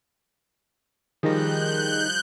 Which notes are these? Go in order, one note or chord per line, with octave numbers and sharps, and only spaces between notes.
D#3 F3 G3 G#4 F#6 G6 A#6